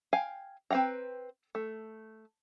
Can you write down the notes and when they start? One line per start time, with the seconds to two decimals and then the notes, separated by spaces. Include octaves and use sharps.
0.13 F5 G5 G#5
0.70 C4 B4 F#5 G5 A#5
1.55 A3